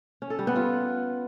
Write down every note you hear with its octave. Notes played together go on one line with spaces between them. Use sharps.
C#4
A4
G3
B3
F4